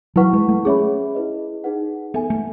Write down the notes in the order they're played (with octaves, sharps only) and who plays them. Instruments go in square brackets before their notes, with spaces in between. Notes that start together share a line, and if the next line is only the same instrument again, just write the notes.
[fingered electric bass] F#3 [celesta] E4 B4 F#5 C#6
[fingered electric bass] G#3
A3
[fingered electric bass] C#4 [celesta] G#4 C#5 E5 B5
[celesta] E4 G#4 B4 D#5
D#4 G#4 B4 F#5
[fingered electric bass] B3 [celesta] A4 E5 G#5
[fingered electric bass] A3